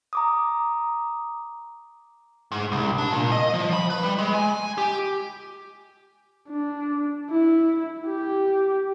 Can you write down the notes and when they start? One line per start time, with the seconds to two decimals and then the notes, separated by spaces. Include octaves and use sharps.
0.13 A#5 D6 D#6
2.52 G#2
2.72 C2
2.98 D4
3.12 A#2
3.32 D#5
3.54 F3
3.73 B5
3.90 B4
4.03 G3
4.18 G#3
4.34 G#5
4.78 G4
6.49 D4
7.30 E4
8.07 G4